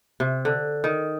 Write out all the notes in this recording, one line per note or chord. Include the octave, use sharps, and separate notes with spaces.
C3
D3
D#3